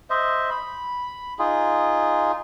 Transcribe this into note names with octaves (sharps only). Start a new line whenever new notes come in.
C5 D#5 E5
B5
D#4 F4 G#4